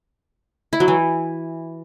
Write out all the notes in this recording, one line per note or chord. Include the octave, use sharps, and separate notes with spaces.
E4
F#3
E3